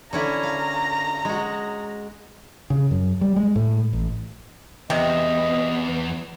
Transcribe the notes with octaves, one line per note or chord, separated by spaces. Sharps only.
D3 C#4 E4 A#5
F5
G#3 F#4
C#3
F#2
G3
G#3
A2
A1
E2 C3 B3 D#5